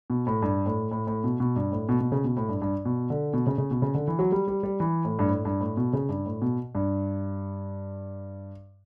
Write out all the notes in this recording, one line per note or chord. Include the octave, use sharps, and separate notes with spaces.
B2
A2
G2
A2
A2
A2
B2
B2
G2
A2
B2
B2
C#3
B2
A2
G2
G2
B2
D3
B2
C#3
C#3
B2
C#3
D3
E3
F#3
G3
G3
G3
E3
A2
G2
A2
G2
A2
B2
C#3
G2
A2
B2
G2